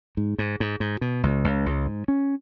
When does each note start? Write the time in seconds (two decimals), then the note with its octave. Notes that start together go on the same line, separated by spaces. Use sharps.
0.17 G#2
0.38 G#2
0.60 G#2
0.80 G#2
1.01 B2
1.23 C#2
1.44 C#2
1.66 C#2
1.86 G#2
2.08 C#4